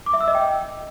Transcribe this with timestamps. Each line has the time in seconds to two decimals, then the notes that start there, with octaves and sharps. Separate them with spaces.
0.06 D6
0.14 E5
0.21 E6
0.28 D#5
0.35 G5